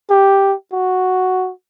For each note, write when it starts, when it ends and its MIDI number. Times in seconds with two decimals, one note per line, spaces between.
0.10 0.54 67
0.73 1.51 66